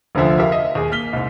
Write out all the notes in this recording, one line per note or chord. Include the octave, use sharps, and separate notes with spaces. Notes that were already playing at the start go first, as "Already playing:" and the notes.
F1 D2 D3 F3 E5
G4 A#4 E5 F5
D#5 E5
D#2 G#4
A#3 F6 B6 G7
C2 G#2